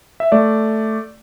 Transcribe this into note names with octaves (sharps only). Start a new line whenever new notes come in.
E5
A3 D5